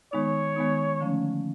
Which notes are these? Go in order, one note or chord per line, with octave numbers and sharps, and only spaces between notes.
D#3 G#3 B3 D#4 C#5
D#3 G#3 B3 D#4
D3 F3 A3 C#4